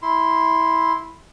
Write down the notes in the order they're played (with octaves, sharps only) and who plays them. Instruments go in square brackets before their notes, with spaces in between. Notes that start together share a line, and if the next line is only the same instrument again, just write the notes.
[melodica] E4 C6